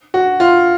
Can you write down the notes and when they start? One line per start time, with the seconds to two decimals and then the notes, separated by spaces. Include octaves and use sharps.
0.14 F#4
0.40 F4